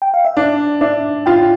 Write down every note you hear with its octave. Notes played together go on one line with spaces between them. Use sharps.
G5
F5
E5
D4 D5
D4 E5
F4 G5